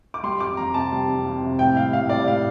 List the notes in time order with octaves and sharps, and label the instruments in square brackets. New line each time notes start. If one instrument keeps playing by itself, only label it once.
[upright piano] D6
G3 C6
F2 D6
F2 A#5
C3 A5
G3
F2
F2
C3
A2 G5
G3 F5
A2 F5
G3 D5
A2 F5